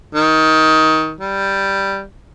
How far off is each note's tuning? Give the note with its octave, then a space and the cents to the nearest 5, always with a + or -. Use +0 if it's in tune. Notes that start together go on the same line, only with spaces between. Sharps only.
D#3 +20
G3 +0